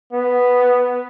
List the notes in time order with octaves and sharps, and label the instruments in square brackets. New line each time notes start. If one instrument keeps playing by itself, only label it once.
[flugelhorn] B3